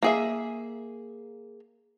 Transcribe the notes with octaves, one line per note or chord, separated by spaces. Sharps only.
A#3 G#4 E5